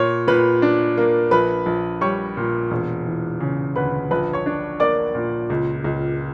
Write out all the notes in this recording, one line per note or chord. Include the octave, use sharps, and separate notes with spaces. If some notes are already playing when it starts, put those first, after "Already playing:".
Already playing: A#2 C#5
A#2 B4 B5
D4
A#3
A#1 B4 B5
A#1
G3 C#5 C#6
A#2
E1
E3
C#3
D2 B4 B5
A#1 B4 B5
C#5 C#6
D4
A#3 D5 D6
A#2
C#2
C#2